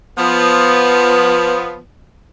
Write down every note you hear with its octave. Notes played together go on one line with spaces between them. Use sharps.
F3 B3